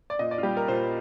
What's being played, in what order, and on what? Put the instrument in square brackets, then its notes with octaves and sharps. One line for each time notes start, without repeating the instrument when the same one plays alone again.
[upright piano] D5
A#2 D#5
D5
F4
G3 G4
A#4
A#2 C5